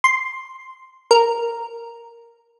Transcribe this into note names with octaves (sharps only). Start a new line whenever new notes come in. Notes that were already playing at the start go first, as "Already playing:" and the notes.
C6
A#4